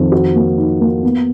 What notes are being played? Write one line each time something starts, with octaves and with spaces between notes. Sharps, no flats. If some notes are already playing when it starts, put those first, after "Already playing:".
Already playing: F2 D#3
F#4
A#3
D#4
A#3
B3